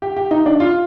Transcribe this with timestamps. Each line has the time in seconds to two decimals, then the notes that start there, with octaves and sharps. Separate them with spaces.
0.02 G4
0.16 G4
0.31 D#4
0.46 D4
0.60 F4